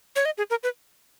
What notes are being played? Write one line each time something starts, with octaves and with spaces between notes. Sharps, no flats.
C#5
D#5
G#4
A#4
B4